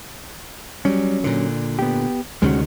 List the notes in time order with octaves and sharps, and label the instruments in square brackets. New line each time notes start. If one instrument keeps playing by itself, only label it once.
[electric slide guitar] F#3 C#4 [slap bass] G3
[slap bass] A#2 D3
[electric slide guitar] B3 G4
[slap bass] D2 C3 D#3 [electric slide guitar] G#3 C#4 F#4